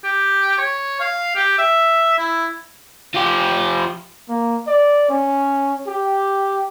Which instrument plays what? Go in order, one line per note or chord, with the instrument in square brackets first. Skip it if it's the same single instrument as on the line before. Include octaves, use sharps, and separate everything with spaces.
[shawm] G4
C#5
F5
G4
E5
E4
[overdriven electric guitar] F3 G4
[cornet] A#3
D5
C#4
G4